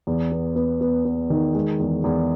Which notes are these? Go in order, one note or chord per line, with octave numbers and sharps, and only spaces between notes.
E2
B3
B3
B3
B3
D#3
G#3
E2
E2